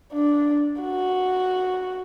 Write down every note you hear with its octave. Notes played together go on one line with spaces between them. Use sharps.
D4
F#4